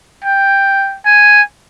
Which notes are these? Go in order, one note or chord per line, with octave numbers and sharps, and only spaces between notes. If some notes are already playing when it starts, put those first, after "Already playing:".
G5
G#5